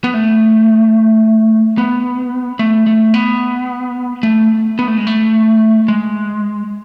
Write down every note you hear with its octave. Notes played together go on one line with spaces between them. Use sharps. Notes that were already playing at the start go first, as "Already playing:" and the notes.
B3
A3
B3
A3
A3
B3
A3
B3
A3
G#3
A3
G#3